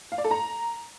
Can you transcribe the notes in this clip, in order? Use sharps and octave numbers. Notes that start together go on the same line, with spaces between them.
F5
D5
A4
A#5